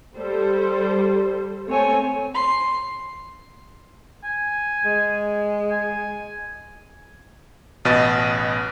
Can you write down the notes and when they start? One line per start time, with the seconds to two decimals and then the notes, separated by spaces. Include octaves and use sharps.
0.16 G3 A4 C5
1.67 A3 C4 A4 C#5 G#5
2.36 C6
4.24 G#5
4.85 G#3
5.71 G#5
7.85 A1 B2 B4 D#5 A6